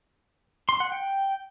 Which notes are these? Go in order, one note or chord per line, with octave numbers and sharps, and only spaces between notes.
C6
F#5
G5